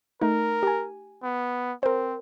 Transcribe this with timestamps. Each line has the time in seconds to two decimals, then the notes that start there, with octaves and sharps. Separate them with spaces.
0.21 A3 D#4 A#4
0.63 G4 G#5
1.23 B3
1.83 C4 A#4 C5